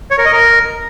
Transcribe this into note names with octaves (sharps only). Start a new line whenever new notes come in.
C#5
A#4
D#5
A#4